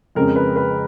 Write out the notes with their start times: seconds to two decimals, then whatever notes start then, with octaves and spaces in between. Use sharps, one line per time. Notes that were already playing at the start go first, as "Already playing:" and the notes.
0.15 F2 C#3 G#3 C#4 A#4
0.36 B4
0.56 B4